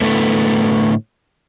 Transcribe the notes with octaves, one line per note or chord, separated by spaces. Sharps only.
A2 D3 A3 B3